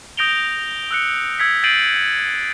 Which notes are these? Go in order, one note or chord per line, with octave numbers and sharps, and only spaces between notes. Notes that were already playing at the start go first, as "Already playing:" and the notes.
D#6 G6 A#6 D7 F7 G7
E6 F#6 C#7
E6 G#6 B6 C#7
G6 A6 C7 D7 D#7 F#7